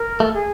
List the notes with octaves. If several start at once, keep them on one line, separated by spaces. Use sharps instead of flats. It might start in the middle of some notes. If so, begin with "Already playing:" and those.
Already playing: A#4
A3 A4
G#4